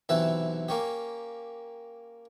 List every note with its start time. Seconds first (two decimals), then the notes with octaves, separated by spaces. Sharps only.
0.09 B1 C3 E3 B4 E5
0.68 A#3 C#4 G4